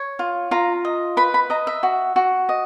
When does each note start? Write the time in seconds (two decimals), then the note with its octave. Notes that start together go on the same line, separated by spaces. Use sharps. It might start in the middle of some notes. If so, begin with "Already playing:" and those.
Already playing: C#5
0.19 F4
0.51 F4 A#5
0.85 D#5
1.17 B4 B5
1.34 B5
1.50 D#5 A#5
1.67 E5
1.83 F#4
2.16 F#4
2.49 D#5